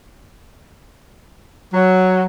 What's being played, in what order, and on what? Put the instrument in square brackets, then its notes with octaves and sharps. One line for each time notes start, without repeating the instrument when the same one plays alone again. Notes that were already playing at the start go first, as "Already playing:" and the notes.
[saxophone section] F#3